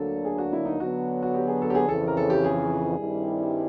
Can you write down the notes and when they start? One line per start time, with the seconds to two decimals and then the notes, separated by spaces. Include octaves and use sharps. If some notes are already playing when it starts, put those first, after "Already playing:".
Already playing: D2 D3 F#3 A#3 D4 A4
0.25 G#4
0.38 F#4
0.53 E4
0.65 D#4
0.80 D3 F#3 B3 F#4
1.23 F#4
1.34 G4
1.47 G#4
1.62 A4
1.70 G4
1.75 G#4
1.88 F2 C#3 E3 A4
2.07 A#4
2.17 A4
2.30 G4
2.44 G#4
2.98 G2 D#3 G3 C4 E4